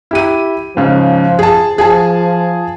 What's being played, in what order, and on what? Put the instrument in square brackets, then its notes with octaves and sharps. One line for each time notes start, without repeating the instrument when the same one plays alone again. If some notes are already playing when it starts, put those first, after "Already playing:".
[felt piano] E4 G4 D#7
[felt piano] G#2 C#3 [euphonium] F3
[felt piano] G#4 A5
[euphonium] F3 [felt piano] G#4 G#5 A5